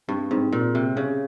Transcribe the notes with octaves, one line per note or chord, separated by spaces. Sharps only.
G2 C4
G#2 C4
A#2 C4
C3 C4
C#3 C#4